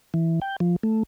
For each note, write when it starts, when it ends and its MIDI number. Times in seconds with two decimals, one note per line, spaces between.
0.14 0.40 52
0.42 0.56 79
0.60 0.76 53
0.83 1.03 57